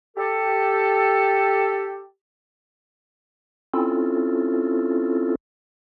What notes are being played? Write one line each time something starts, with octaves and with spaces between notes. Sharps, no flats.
G4 A4
C4 C#4 E4 F4 A4